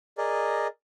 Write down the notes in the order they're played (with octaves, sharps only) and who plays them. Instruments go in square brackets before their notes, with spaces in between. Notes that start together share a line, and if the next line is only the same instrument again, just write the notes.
[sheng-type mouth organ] G#4 A#4 D5 D#5